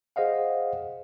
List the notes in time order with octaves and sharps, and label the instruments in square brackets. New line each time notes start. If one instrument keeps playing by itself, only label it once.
[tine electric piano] G#4 C5 D#5 F5 F#5